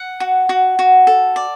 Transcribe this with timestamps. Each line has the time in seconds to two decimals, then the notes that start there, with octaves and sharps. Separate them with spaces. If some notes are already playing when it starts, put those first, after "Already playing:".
Already playing: F#5
0.20 F#4
0.49 F#4
0.79 F#4
1.07 A4
1.36 D5